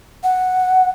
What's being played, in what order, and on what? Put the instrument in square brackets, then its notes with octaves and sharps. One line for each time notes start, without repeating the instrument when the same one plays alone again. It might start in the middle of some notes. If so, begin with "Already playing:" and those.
[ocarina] F#5